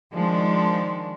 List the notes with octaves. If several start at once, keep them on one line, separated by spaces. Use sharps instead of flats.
D#3 F3 G#3 D4